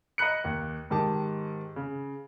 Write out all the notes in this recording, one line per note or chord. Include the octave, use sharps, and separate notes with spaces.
D#5 A#5 B5 F#6 C#7
D#2
G#2 D#3 G4 A5
C#3